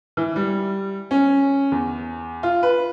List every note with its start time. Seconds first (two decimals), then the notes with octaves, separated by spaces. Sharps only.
0.17 E3
0.36 G3
1.11 C#4
1.72 E2
2.43 F4
2.63 B4